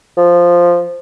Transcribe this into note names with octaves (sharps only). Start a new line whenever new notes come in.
F3